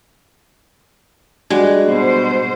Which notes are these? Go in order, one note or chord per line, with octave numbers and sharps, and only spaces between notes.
G3 G#3 D4 F#4
B2 C5